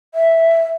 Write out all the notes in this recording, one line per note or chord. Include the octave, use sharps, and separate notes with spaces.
E5